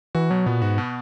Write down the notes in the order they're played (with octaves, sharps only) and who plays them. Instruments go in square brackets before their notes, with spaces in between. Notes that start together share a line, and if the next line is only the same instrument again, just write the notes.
[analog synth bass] E3 [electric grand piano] F#4
[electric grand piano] B2 [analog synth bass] F#3
[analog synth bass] A#2 [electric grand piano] B3
[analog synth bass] G#2 [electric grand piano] F#4
[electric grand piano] B2